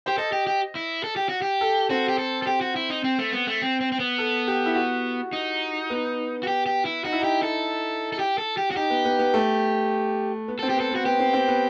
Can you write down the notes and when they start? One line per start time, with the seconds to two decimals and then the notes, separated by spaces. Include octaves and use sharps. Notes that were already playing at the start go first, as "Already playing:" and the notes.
0.06 G4 C5
0.18 A4 D#5
0.32 G4
0.47 G4
0.75 E4
1.04 A4
1.16 G4
1.29 F#4
1.42 G4
1.61 A4
1.90 C4 F#4
2.09 G4
2.18 A4
2.43 A4
2.47 G4
2.61 F#4
2.76 E4
2.90 D#4
3.04 C4
3.19 A3
3.32 B3
3.47 A3
3.62 C4
3.81 C4
3.92 C4
4.00 B3
4.18 A4
4.48 G4
4.66 E4
4.75 F#4
5.33 D#4
5.90 B3
6.43 F#4
6.47 G4
6.66 G4
6.85 E4
7.05 D#4 F#4
7.12 E4
7.20 D#4
7.24 G4
7.43 A4
8.13 A4
8.19 G4
8.38 A4
8.57 G4
8.71 F#4
8.76 D#4 G4
8.90 B3
9.05 B3
9.19 B3
9.34 A3
10.48 B3
10.59 C4 A4
10.69 G4
10.76 B3
10.80 A4
10.91 B3
10.95 F#4
11.05 B3 G4
11.19 C4
11.34 C4
11.48 B3